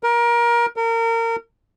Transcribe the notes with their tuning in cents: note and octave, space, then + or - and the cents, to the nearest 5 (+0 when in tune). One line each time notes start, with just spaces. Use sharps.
A#4 +25
A#4 -30